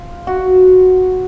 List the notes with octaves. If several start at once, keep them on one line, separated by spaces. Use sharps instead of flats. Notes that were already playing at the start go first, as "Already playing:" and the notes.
Already playing: F4
F#4